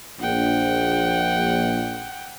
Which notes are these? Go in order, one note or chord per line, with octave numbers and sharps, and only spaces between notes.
A#1 F#5 G5